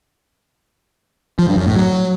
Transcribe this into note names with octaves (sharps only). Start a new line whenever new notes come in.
F3
G2
F#2
A2
F#3